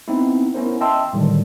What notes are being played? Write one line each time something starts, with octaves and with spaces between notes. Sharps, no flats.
B3 C4 D#4 E4
B3 C#4 E4 A#4 C5
D#5 E5 G5 A5 C6 E6
A2 D3 D#3 F#3 G3